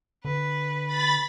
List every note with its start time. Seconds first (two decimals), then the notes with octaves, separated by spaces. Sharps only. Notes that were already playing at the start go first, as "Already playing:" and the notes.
0.25 D3 B4
0.86 B5 A6